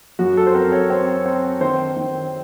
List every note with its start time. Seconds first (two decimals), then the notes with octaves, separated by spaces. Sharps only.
0.19 F#2 F#4
0.37 A4
0.47 C5
0.54 C4 A#4
0.72 C#5
0.90 C4 C#5
1.26 C4
1.61 D#3 C5
1.96 D#3